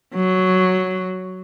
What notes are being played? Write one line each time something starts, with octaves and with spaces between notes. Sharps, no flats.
F#3